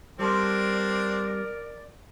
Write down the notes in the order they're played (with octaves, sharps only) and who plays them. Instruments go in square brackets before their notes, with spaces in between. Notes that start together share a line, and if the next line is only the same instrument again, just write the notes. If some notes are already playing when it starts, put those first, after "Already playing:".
[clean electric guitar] G3 A5 C6 [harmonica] C4 D4 [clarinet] A#4 [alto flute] D5